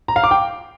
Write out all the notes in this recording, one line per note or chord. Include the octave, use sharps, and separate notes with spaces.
A#5
F5
D6
G5